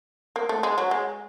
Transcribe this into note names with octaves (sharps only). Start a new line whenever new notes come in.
A#3
A3
G#3
F#3
G#3